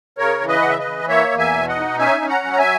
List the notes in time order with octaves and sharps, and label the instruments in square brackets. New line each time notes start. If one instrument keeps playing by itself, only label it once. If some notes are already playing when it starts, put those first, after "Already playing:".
[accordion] C#3 A#4 C#5
E3
B4 D#5
C#3 F#5
E5
B4 D#5
E3
A#3 C#5 E5
E2
E5 G#5
B2
D#5 F#5
D#4
C#4 E5 G#5
C#4
F#5 A#5
F#3
A#5
E5 G#5